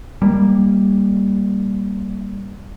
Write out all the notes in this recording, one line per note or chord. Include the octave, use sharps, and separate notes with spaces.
G3 A#3